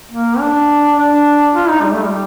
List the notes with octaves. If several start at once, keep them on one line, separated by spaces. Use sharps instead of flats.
A#3
D4
D4
F4
D#4
G3
A3
G3